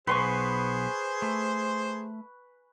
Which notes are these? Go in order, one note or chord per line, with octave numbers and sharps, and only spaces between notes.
B1 B3 G#4 B4 C5 G#5 C6 C#6
A3